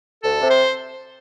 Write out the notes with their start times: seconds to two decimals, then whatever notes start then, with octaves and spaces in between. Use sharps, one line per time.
0.23 D2 A4
0.41 C3
0.50 C5